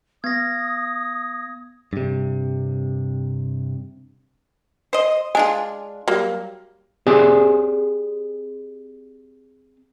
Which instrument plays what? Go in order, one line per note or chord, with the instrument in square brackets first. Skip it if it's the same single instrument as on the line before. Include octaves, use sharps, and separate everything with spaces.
[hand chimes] B3 [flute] D#6 [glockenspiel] G#6 A#6
[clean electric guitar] G2 C3
[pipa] C5 D#5
[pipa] G#3 D4 F4 [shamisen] G#5
[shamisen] F#3 G3 [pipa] A#3
[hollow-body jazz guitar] C4 G4 G#4 D5 G#5